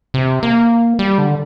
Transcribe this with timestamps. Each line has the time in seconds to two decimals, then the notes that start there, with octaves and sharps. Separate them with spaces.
0.14 C3
0.43 A#3
0.99 G3
1.18 D3